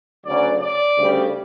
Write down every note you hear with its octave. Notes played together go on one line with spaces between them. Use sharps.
D2 C#3 F#3 D5
D5
D2 C#3 G3